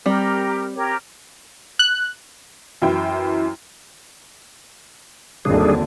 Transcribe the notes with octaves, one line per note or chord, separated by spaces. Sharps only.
G3 C4 G4 A#4
G4 A#4 C#5
F#6
F#2 E3 E4 G5
G#1 D#2 D3 G3 D4 G#4